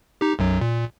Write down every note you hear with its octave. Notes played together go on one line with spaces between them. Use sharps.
D#4 G4
B1 F#2 F#3
A#2